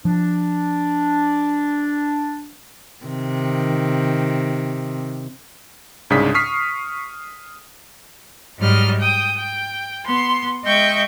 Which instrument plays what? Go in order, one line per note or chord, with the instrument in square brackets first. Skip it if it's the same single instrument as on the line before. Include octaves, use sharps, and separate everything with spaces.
[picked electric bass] F3 [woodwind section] D4
[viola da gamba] C3 D#3
[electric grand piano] C2 G#2 C#3 D4 D#6 B6
C#6 D#6 F6 B6 C7
[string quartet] G#2 F#3 G3 D#5 F6
G5 D#6
G5
B3 C6
G#3 D#5 E5 G5 C#6 G6